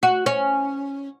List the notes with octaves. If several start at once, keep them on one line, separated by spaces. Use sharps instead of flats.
F#4
C#4